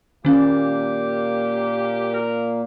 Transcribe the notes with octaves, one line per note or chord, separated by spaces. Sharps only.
A#2 D#3 A#3 C#4 G4
A#4